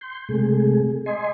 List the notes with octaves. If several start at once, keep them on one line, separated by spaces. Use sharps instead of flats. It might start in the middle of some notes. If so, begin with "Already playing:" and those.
C6 G6
C3 G#3 A3 G#4
D#5 G#5 C6